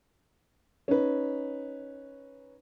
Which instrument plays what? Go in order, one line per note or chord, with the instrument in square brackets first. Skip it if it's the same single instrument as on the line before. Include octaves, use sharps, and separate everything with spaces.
[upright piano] C#4 D#4 B4